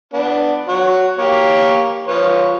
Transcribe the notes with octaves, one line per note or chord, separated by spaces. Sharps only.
B3 D4
F#4 C#5
A#3 G4 C#5
F3 B4 C#5